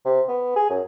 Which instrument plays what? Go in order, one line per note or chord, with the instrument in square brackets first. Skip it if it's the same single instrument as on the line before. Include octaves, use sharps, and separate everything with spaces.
[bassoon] C3
B3
G#4
F#2